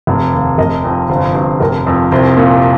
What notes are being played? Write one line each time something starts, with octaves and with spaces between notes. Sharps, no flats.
F1
D#2
F1 A#4 D#5
F2
G1 C5
G2 C5
F1 A#4
F2
C2 C5
A#2